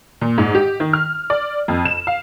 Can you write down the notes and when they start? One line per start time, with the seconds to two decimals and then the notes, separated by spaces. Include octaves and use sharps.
0.21 A#2
0.38 G#2
0.55 G4
0.80 D#3
0.93 F6
1.30 D5
1.68 F2
1.85 E7
2.07 F5